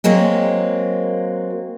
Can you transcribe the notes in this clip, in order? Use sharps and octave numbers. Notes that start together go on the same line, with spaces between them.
F#3 G#3 A#3 C4